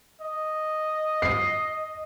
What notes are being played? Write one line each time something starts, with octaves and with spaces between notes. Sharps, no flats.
D#5
C7